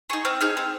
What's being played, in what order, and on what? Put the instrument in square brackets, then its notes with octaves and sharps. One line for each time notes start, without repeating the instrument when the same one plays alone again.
[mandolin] D#4 G#4 C#6
C4 F6
D#4 G#4 F6
C4